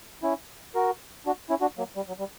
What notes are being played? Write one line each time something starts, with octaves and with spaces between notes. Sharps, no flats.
C#4 E4
F#4 A#4
D4 F#4
C#4 E4
D4 F#4
F#3 A#3
G3
F#3
G3